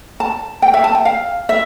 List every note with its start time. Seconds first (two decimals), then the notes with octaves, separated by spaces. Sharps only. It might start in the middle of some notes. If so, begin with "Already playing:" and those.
0.20 A5
0.62 G5
0.74 E5
0.84 A5
0.95 G5
1.05 F5
1.49 E5